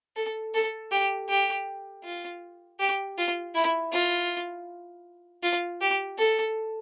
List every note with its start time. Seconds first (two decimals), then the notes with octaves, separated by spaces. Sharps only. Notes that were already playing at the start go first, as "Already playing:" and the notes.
0.16 A4
0.54 A4
0.91 G4
1.29 G4
2.04 F4
2.79 G4
3.18 F4
3.55 E4
3.93 F4
5.43 F4
5.81 G4
6.18 A4